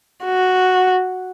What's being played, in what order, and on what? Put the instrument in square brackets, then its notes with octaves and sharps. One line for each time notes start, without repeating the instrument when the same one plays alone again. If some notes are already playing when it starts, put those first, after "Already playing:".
[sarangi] F#4